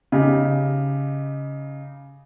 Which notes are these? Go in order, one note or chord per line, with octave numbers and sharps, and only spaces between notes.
C#3 D#4 G4